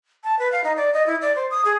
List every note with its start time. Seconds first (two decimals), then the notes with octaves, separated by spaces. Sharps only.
0.24 A5
0.39 B4
0.52 F5
0.64 D#4
0.77 D5
0.94 D#5
1.06 E4
1.21 D5
1.36 C5
1.51 D#6
1.65 G#4